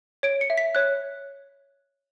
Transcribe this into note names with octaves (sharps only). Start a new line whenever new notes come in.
C#5 D7
C#7
E5
B6
C#5 F#6